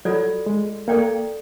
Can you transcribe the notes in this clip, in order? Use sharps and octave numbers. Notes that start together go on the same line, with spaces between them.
F#3 F4 A4 D5
G#3
A#3 A4 D5 G5